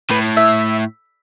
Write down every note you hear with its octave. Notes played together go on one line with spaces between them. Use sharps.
A2 B4
E5